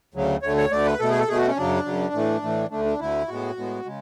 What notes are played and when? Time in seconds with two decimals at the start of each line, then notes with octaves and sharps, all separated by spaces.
0.14 D2 C#3 F#3
0.43 D2 D3 A3 C#5
0.57 C#5
0.71 D2 D3 A3 D5
0.86 B4
0.99 B2 A3 A4
1.10 G#4
1.19 A4
1.28 B2 A3 G#4
1.37 F#4
1.48 C#4
1.57 F#2 C#3 F#3 D4
1.85 F#2 C#3 F#3
2.14 A2 E3 A3
2.42 A2 E3 A3
2.71 D2 D3 A3 D4
2.85 D4
3.00 D2 D3 A3 E4
3.28 A2 G#3 B3 F#4
3.57 A2 G#3 B3
3.85 C#3 G#3